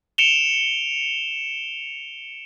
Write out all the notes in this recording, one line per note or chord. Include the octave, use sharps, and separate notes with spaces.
C#7 D7 E7 F7 G7